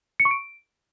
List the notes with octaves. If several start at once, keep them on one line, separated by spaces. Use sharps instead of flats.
C#7
C#6
D7